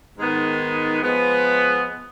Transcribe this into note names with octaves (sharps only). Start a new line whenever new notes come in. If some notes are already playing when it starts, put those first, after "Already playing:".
G#2 D#3 G#3 B3
F3 G#3 B3